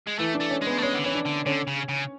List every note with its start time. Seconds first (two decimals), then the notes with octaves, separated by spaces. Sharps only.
0.08 G#3
0.19 E3 A3
0.35 D4
0.41 A3
0.51 C#4
0.62 G#3
0.67 B3
0.78 A3
0.83 G#3 C#4
0.94 D3
1.04 E3 C#4
1.15 D4
1.25 D3
1.46 D3 C#4
1.67 C#3
1.89 C#3